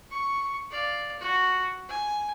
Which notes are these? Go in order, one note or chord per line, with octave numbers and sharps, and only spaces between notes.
C#6
D5 F5
F#4
G#5